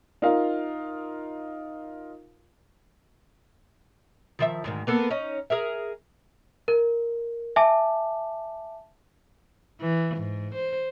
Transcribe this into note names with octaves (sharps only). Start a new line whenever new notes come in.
D#4 F4 A#4 F5
D#3 F3 E5
D2 G#2 D#3
A#3 B3 A4
C#4 D#4
G#4 A#4 E5
A#4
E5 G#5 A5 D6
E3
G#2
C5